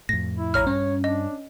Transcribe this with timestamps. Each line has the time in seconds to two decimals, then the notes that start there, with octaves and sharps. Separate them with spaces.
0.09 F2 A2 A#6
0.37 E4
0.54 A#1 C#5 A#5 F6
0.67 G2 C#4 C#5
1.04 D4 D#5